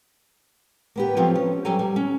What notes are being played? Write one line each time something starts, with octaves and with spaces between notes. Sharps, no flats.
A#3 B3 G4
F3 F#3 B3 C4 F4 A4
C#4
F#3 G3 A4 G5 G#5 A#5
G3
C#4